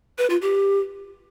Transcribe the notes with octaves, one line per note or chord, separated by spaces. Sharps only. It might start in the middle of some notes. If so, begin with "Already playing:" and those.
B4
F4
G4